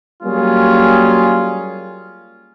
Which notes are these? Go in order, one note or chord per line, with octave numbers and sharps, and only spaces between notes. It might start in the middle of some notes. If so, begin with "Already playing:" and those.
F#3 G3 A#3 C#4 F4 G#4